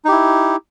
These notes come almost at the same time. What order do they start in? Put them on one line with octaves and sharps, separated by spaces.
D#4 G4 E4